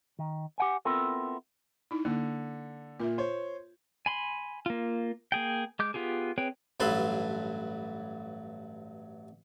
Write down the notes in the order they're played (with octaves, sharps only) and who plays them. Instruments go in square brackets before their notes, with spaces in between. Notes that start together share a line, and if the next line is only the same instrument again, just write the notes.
[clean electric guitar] D#3
G4 F#5 G#5
B3 C4 E4 F4 A4 A#4
[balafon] D#4 E4
[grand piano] D3 [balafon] A#3
[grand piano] A#2 [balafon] F4 A#4 E5
[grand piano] C5 C#5
[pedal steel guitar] G#5 B5 C6
A#3 F4
A#3 G#4 G5
G#3 D6 G6
B3 F4 G4 G#4
C4 G#4 B4 C#5 G5
[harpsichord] A1 G2 F#3 A4 B4 C6